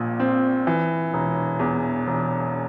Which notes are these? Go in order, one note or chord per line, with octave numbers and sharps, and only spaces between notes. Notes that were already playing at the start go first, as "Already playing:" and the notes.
Already playing: A#1 A#2
C4
E3
E1
E2
E1